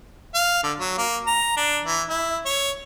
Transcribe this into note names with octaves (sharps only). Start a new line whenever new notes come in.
F5
D3
F#3
A#3
A#5
D4
E3
E4
C#5